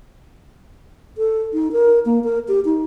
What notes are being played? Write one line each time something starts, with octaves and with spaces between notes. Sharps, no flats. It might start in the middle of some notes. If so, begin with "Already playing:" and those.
A4
D#4
A#4
A#3
A#4
G4
D#4